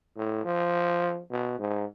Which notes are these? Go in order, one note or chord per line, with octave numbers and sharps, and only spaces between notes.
A2
F3
B2
G#2